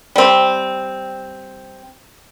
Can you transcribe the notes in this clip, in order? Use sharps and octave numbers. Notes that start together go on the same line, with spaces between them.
G3 C4